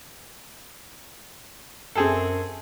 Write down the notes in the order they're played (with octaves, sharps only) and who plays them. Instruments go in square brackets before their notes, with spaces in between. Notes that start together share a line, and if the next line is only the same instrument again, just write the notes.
[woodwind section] F#2 [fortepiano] C4 G#4 A4